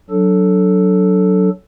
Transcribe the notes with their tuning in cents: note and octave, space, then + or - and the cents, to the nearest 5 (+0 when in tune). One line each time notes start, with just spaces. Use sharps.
F#3 +0 D4 +0 A4 +0